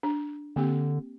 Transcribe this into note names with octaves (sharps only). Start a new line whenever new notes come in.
D4
D3 A#3 C4 G4